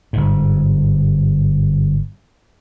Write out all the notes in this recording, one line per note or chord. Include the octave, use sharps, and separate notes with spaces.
G1 G#2